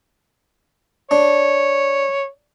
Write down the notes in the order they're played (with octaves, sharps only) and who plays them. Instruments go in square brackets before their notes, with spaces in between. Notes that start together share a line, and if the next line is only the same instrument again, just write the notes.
[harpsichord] D4 [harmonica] C#5